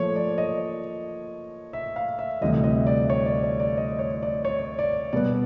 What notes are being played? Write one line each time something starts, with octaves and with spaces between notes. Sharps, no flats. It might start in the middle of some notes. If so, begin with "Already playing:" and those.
Already playing: A#2 F3 A3 C#5
D5
D#5
E5
F5
E5
D2 C3 E3 G3 D#5
D#5
D5
C#5
D5
D5
D5
D#5
C#5
D5
C#5
D5
B2 G3 B3 D5